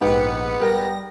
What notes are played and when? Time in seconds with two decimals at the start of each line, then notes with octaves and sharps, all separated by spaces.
0.01 A#1 G#2 B3 G4 B4 C#7
0.60 G3 G4 A#4 G5 A#6